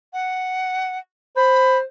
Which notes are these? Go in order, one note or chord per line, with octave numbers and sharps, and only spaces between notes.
F#5
C5 B5